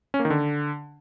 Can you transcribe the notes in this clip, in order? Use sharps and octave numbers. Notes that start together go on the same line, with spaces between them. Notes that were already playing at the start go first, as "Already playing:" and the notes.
C#4
A#3
D#3
D3